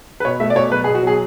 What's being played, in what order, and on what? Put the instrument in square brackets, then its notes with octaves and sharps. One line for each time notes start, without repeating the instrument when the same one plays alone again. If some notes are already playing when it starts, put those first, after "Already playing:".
[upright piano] B4
B2 C#5
A3 E5
D5
B2 C#5
F#3 B4
G#4
B2
F#4
F#3 G#4